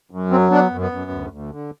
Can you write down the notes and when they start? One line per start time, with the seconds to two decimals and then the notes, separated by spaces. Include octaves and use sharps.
0.11 F#2
0.31 F#3 C4
0.50 B3 D4
0.70 F#2
0.81 B3
0.92 F#2
1.11 D2
1.31 D2
1.51 D3